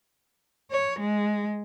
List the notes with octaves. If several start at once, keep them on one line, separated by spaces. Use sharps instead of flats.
C#5
G#3